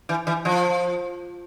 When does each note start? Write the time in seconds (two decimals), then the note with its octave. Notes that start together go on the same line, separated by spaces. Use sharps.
0.09 E3
0.27 E3
0.45 F3